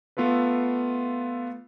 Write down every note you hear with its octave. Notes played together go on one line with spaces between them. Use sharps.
A3 B3 F4 A4 B4